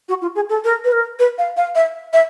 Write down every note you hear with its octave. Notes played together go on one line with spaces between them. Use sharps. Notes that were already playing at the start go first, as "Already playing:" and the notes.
F#4
F4
G#4
A4
A#4
B4
A#4
B4
F5
F5
E5
E5